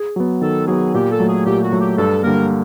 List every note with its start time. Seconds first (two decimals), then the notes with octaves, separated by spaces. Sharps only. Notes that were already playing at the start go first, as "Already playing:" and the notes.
Already playing: G#4
0.16 F#3 B3
0.41 D#3 A4
0.67 F#3 B3 G#4
0.94 A#2 G4
1.11 A4
1.20 F#3 A3
1.28 G#4
1.46 A#2 G4
1.63 F#4
1.72 F#3 A3
1.80 G4
1.97 G2 A4
2.23 D3 G3 A#3 A#4